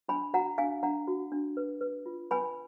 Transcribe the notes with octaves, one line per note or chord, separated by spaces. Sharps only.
D4 G#5 B5
F#4 F#5 A#5
D4 F5 G#5
D4 F#5 A#5
F#4
D4
B4
B4
F4
B4 G#5 B5